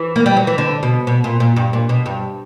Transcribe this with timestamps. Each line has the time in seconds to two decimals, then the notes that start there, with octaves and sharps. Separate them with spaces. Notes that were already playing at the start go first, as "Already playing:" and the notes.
Already playing: E3
0.16 A#3
0.26 G3
0.37 F#3
0.47 E3
0.58 D3
0.83 B2
1.07 B2
1.24 A#2
1.40 A#2
1.56 G2
1.73 A#2
1.89 B2
2.06 G2